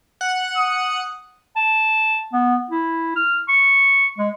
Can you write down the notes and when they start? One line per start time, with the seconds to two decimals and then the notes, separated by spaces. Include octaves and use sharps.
0.21 F#5
0.57 D#6
1.56 A5
2.33 B3
2.70 E4
3.16 F6
3.49 C#6
4.18 G#3